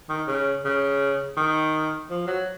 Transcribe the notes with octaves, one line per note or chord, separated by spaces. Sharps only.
D#3
C#3
C#3
D#3
F3
F#3